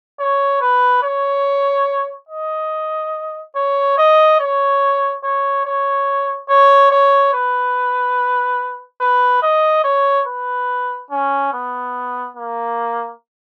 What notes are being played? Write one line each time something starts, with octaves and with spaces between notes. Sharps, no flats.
C#5
B4
C#5
D#5
C#5
D#5
C#5
C#5
C#5
C#5
C#5
B4
B4
D#5
C#5
B4
C#4
B3
A#3